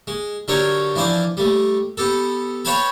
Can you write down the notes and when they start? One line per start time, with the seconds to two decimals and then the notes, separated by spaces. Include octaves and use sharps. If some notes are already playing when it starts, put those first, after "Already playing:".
0.07 G#3
0.48 D3 F#3 D4 G4 A#4 C#5
0.96 E3 F3 D4 C5 D5
1.37 G3 A3
1.97 B3 G4 A4
2.65 B4 C#5 F5 G5 A5 B5